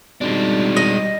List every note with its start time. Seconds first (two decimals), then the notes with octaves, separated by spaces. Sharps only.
0.21 G#1 G3 G#3 D4
0.76 D#5